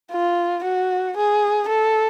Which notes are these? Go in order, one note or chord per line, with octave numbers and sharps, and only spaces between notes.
F4
F#4
G#4
A4